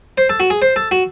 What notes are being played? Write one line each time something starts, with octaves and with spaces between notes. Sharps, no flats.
C5
A4
F#4
G#4
C5
A4
F#4